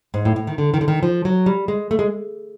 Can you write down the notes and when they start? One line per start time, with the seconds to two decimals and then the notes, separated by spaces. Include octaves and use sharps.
0.14 G#2
0.25 A2
0.36 A2
0.47 D#3
0.58 D3
0.74 D#3
0.81 D3
0.88 D#3
1.03 F3
1.25 F#3
1.46 G3
1.68 G#3
1.91 A3
1.99 G#3